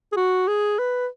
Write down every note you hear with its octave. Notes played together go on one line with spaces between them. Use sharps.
G#4
F#4
G#4
B4